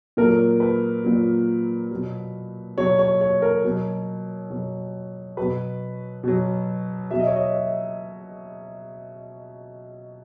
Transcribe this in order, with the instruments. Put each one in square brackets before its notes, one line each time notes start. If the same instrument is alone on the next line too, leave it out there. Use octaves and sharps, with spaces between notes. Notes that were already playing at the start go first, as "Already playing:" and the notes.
[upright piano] A#2 F#3 A#4
B4
A#2 F#3
B2 F#3
B2 F#3 C#5
C#5
C#5
A#4
B2 F#3
B2 F#3
B2 F#3 B4
B2 F#3
B2 F#3 E5
D#5
C#5
D#5
E5